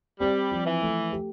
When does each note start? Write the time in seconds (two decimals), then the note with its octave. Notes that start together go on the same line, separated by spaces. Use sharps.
0.20 G3 C4
0.51 F3
0.66 E3
0.82 A3
1.12 G4